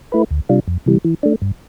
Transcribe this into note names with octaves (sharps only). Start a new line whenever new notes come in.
A3 E4 B4
D2
C3 G3 D4 F4
F2
C3 E3 G3
E3
A3 D4
G2